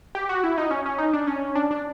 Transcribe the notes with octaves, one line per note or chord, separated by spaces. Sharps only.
G4
F#4
E4
D#4
C#4
C#4
D#4
D4
C#4
D4
D4